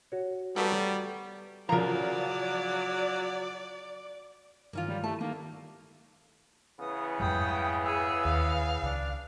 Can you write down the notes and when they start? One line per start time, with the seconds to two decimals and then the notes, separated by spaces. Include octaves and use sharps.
0.12 F#4 C#5
0.56 F#3 G3 A3 B3
1.69 C#3 F3 F#3 A#4 D5 A#5
4.73 G2 D#3 E3 A#3 C#4 F4
4.88 G3
5.04 A3 E4 G4 A4 A5
5.21 D#3 A#3 D#4
6.80 C#3 E3 B3 D#6
7.20 F2 G#2 G3 G5 D#6
7.84 G#4 E6
8.25 D#2 F5
8.82 C#2 D4